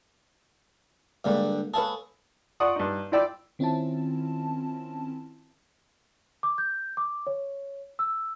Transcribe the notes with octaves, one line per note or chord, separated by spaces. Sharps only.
G2 D3 G3 G#3 A#3 F5
G#4 A4 B4 C#5 F5 A5
F4 D5 F#5 C#6 D#6
G2 D#4
E4 F4 D5 G5 E6
D#3 C4 C#4 E4 F4 A5
D6
G6
D6
C#5
E6